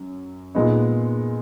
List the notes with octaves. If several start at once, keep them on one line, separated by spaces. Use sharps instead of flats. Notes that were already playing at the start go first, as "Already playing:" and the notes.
Already playing: F#2
A#2 G#3 B3 D#4